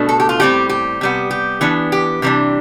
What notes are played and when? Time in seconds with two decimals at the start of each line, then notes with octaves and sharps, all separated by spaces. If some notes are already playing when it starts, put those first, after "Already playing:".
Already playing: B2 A3 D4
0.09 A4
0.20 G4
0.29 F4
0.40 A2 G3 C4 G4
0.69 G4
1.01 C3 G3 B3
1.31 G4
1.61 E3 B3 D4
1.92 G4
2.22 C3 E3 G3 D4